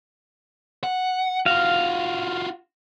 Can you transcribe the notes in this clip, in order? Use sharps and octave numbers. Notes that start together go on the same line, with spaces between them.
F#5
F4 F#4 F5